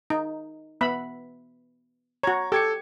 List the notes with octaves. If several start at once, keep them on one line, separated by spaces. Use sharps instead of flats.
D#4
B3 E5 B5
F#4 C#5 A#5 G#6
G4 A4 G#6 C#7